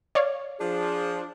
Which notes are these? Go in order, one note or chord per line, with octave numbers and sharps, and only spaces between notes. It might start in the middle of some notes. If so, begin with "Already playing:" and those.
C#5 D5 F5
F3 D4 G#4